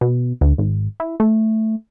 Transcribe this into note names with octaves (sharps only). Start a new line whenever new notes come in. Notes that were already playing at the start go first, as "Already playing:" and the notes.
B2
D2
G#1
E4
A3